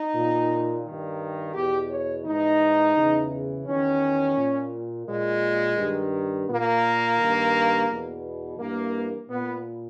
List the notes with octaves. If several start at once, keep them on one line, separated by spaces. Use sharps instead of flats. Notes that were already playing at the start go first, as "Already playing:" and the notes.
Already playing: D#4
A#2
G2 D#3
E2 B2 G4
C#5
G#2 E3 D#4
E2 C#3 E3
E2 D#3 C#4
A#2
A#2 G#3
G2 D#3
A#2 A#3
G2 D#3
E2 B2
G2 E3 A#3
A#2 B3